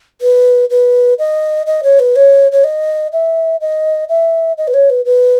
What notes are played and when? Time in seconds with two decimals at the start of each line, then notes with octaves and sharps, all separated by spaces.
0.22 B4
0.70 B4
1.19 D#5
1.67 D#5
1.83 C#5
1.99 B4
2.16 C#5
2.52 C#5
2.64 D#5
3.13 E5
3.61 D#5
4.09 E5
4.58 D#5
4.68 B4
4.74 C#5
4.90 B4
5.05 B4